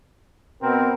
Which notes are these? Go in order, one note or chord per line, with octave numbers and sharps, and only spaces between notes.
B2 B3 C4 A#4